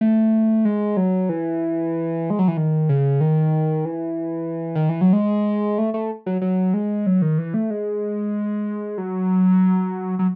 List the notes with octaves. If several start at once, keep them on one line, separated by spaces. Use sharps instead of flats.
A3
G#3
F#3
E3
G#3
F#3
E3
D#3
C#3
D#3
E3
D#3
E3
F#3
G#3
A3
A3
F#3
F#3
G#3
F#3
D#3
E3
A3
G#3
F#3
F#3